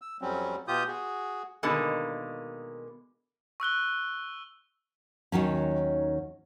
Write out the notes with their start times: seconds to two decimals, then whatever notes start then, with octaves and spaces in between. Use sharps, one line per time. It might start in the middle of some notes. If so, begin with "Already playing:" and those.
0.02 E6
0.21 F2 F#3 G3 C4 C#4
0.68 B2 F4 G4 D#6 G6
0.87 F#4 G#4
1.63 B2 D3 D#3 G#3 A#3
3.60 C#6 E6 F#6 G7
5.32 D#2 D#3 F#3 C#4